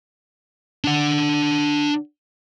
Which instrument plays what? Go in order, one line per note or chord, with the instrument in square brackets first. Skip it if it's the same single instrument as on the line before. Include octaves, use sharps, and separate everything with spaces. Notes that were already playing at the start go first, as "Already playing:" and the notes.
[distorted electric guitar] D4 F#5